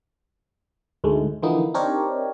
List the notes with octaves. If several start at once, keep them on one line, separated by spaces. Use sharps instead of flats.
D2 G#2 G#3 A3
D3 E3 F3 A#3 B3 D#4
C4 D4 D#4 G4 A#4 C#5